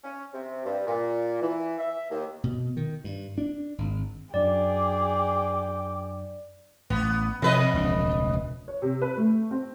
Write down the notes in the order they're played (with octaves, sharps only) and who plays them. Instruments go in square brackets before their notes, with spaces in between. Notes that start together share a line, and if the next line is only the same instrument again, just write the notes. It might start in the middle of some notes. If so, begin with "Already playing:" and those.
[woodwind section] C#4
C3
G2
A#2
E3
E5
D#2
[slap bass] B2
D#3
G2
D4
G#1
[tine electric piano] F#2 F#3 D4 [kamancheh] G#4 G5 [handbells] D5 [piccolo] D6
[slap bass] A1 [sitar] B3
[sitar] F2 B4 D#5 [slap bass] C3
[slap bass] E1 C#2 D4
[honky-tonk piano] C#5
C3
B4
A3
C4